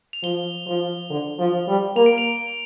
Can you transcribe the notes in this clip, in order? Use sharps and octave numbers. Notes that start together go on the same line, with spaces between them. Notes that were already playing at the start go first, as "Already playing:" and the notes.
F7
F3 G7
F3
D3
F3
G3
A#3 F7
D7
F7